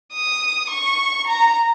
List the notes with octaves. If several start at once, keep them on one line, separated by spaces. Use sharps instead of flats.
D#6
C#6
A#5